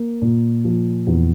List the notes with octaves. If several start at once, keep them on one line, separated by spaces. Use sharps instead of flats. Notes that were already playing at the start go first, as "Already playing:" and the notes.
Already playing: A#3
A#2
F3
E2